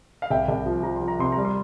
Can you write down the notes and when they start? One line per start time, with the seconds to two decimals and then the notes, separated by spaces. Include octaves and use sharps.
0.22 F5
0.30 C2 E5 G5
0.48 C2
0.66 F3
0.83 F3 A#5
0.96 F3 C6
1.08 A#5
1.19 C3 C6
1.32 A#5
1.37 G3
1.45 C6